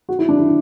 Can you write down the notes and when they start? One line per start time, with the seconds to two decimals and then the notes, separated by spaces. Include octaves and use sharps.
0.09 F#4
0.19 E4
0.29 D4
0.39 E4